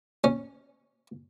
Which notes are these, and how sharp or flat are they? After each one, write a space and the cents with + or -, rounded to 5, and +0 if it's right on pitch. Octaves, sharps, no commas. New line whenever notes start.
C#4 -5